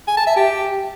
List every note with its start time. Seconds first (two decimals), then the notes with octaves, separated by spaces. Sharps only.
0.07 G#5
0.17 A5
0.27 E5
0.36 G4